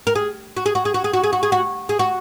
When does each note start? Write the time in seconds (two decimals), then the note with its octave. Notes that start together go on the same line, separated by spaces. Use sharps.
0.07 A#4
0.15 G#4
0.57 F#4
0.66 G#4
0.75 F#4
0.85 G#4
0.94 F#4
1.04 G#4
1.13 F#4
1.24 G#4
1.33 F#4
1.43 G#4
1.52 F#4
1.89 G#4
1.99 F#4